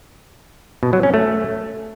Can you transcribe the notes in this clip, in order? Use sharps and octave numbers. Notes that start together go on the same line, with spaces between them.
B2
F#3
C#4
A3